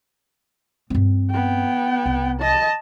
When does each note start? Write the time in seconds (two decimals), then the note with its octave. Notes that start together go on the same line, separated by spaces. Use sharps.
0.90 G2 C4
1.31 B3 G5
2.06 C2
2.40 D#5 A5